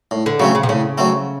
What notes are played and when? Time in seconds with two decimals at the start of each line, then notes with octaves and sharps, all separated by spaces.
0.11 A2
0.26 D3
0.39 C#3 F#3 A3 C4
0.55 C#3
0.63 C3
0.69 A2 C#3
0.98 F#3 A3 C4